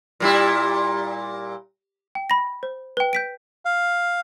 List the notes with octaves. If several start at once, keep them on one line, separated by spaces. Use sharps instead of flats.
A#2 G3 E4
G5
B5 A#6
C5
B4 G5
G6 B6 D7
F5